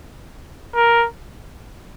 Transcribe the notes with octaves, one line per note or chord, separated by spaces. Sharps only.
A#4